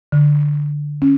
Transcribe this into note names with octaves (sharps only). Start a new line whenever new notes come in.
D3
C#4